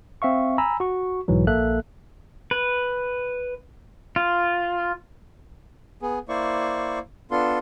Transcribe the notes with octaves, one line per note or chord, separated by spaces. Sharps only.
C4 E5 F5 C#6
G#5 A#5 B5 E6
F#4 C#6
B1 G#2 E3 F#3
A#1 A#3 A4 E5 F#6
B4
F4
B3 G#4
A#3 E4 C5 D5 C#6
B3 D4 F4 A4 C6